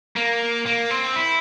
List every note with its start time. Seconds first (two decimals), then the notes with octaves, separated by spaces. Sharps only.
0.16 A#3
0.66 A#3
0.90 C4
1.16 E4